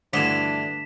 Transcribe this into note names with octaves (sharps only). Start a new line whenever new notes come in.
D2 G2 D3 E3 D4 B6 C7 E7